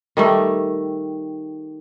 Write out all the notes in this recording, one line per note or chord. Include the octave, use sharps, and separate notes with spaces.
D#3 G3 A3